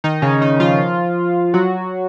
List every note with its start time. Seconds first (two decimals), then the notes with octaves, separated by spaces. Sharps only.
0.04 D#3 D#4
0.22 C#3 C#4
0.41 D#3 D#4
0.60 F3 F4
1.54 F#3 F#4